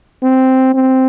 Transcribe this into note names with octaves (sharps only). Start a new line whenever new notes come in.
C4
C4